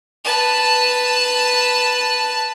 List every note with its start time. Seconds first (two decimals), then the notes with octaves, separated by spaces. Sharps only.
0.25 B4 A5